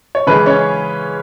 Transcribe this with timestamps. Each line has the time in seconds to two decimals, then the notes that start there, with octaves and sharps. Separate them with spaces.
0.15 C#5
0.27 C#3 E3 G#3 B4
0.46 C#4 C#5